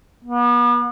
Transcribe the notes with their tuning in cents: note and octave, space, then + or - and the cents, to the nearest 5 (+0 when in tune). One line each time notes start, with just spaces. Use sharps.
B3 -40